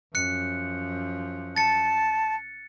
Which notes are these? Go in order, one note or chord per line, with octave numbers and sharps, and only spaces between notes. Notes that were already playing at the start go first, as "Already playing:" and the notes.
F#2 F3 F#6 C#7
A5 A6 C#7